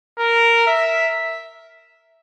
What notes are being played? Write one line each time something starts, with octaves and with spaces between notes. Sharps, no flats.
A#4
E5